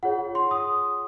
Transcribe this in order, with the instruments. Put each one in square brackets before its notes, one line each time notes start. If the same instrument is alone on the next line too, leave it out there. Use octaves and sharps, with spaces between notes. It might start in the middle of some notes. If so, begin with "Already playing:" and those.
[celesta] F4 G#4 C#5 F#5
C6
D#6